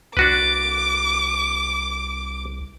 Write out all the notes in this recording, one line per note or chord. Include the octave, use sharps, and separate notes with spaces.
C2 D4 F#4 B4 D6